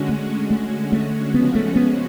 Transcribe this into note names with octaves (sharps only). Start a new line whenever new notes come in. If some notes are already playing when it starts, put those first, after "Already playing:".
Already playing: D3 G#3 C#4 F#4
A3
D3 G#3 A3 C#4 F#4
A3
C#3 F3 G#3 B3 C#4 F#4
A3
B3